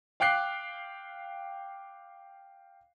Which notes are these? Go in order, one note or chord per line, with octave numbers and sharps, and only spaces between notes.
F5 G5 D6 F#6 C7